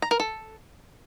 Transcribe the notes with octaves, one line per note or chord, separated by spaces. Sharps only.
A#5
A#4
A4